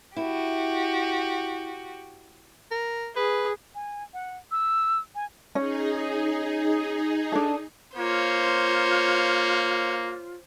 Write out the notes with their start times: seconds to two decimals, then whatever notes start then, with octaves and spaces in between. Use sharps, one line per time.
0.16 E4 F#4 G4
2.71 A#4
3.16 G#4 B4
3.75 G#5
4.14 F#5
4.51 E6
5.15 G#5
5.55 C#4 D#4 G#4
7.32 D4 A4
7.97 A#3 F4 C5 C#5